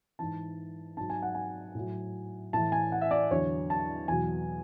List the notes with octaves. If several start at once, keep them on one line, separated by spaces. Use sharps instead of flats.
G#2 E3 A5
G#2 F#3 A5
G#5
F#5
G#5
A2 F#3
A2 E3 A5
G#5
F#5
E5
D5
E2 D3 F#3 C#5
A5
E2 B2 F#3 G#5